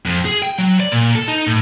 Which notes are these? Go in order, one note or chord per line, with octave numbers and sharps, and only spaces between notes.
F2
G#4
G5
F#3
D5
A#2
A4
D#4
A2